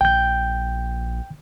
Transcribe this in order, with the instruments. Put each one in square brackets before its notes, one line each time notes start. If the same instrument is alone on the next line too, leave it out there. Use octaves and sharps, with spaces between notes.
[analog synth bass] A#1 [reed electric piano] G5 G6